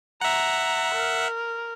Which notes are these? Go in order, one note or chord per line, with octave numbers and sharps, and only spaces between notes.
E5 F#5 A#5
A#4